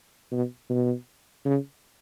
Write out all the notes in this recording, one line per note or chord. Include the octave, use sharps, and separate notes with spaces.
B2
B2
C#3